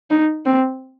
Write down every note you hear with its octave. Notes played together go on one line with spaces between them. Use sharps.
D#4
C4